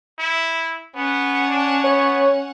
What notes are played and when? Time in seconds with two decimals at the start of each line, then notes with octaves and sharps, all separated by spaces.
0.19 E4
0.95 B3 C#4 F#5
1.49 D4
1.84 B3 C#5